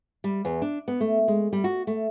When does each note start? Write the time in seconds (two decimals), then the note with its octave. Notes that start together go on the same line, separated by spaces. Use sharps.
0.24 G3
0.45 E2
0.62 D4
0.88 B3
1.00 A3
1.28 G#3
1.53 G3
1.64 F#4
1.87 A3